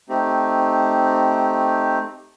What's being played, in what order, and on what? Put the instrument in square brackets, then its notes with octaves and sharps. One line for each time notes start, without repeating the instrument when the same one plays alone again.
[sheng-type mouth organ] A3 C4 D#4 G4